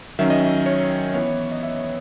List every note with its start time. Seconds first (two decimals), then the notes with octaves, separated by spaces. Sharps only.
0.19 D#3 F#3 C#4 E5
0.30 D#5
0.43 E5
0.66 C#5
1.14 E3 B3 C#5
1.51 D#5
1.63 E5